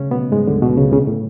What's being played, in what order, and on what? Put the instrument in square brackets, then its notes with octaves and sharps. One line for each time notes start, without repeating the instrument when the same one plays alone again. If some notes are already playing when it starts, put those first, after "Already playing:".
Already playing: [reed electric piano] C#3 C#4
B2 B3
G#2 G#3
D2 D3
B2
C#2 C#3
C#2 C#3
A2